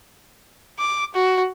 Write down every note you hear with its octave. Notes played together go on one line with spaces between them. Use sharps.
D6
F#4